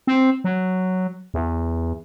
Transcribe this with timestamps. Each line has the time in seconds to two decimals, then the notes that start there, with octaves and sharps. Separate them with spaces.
0.07 C4
0.44 F#3
1.34 E2